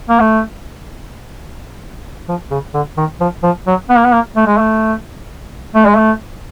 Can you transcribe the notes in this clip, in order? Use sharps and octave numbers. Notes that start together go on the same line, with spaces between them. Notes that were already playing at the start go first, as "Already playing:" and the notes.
A#3
A3
F3
C#3
D3
D#3
F3
F3
F#3
B3
A#3
B3
A#3
A3
G#3
A3
A3
G#3
A3